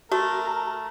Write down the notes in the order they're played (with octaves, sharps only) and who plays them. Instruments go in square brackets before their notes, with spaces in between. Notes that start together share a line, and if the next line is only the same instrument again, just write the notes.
[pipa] A3 [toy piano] F#4 [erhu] A#4